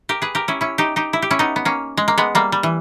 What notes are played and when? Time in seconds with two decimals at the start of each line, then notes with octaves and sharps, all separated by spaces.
0.09 G4 A#4
0.22 G#4 B4
0.35 G4 A#4
0.48 C#4 E4
0.61 C#4 E4
0.78 D#4 G4
0.96 D#4 G4
1.13 E4
1.22 G4
1.31 C#4 E4
1.39 B3 D#4
1.56 B3
1.65 A#3 C#4
1.97 G#3
2.08 A#3
2.18 G#3 B3
2.35 G3 A#3
2.52 G3
2.63 E3